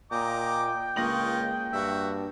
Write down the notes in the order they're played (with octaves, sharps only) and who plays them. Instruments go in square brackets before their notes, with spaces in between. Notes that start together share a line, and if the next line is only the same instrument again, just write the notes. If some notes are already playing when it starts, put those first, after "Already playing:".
[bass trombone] A#2 [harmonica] D#5 A#5 D6 [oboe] G5
[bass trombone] C#2 [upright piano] A#3 A#6 F#7 [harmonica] F4 C#5 D#5
[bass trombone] G2 [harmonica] F#4 E5